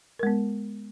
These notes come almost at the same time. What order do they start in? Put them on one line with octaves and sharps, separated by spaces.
A#4 G#3 B3